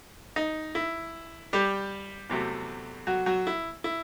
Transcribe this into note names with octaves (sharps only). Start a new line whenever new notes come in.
D#4
E4
G3 G4
E2 C3 F#3 A3
F#3 F#4
F#3 F#4
E4
E4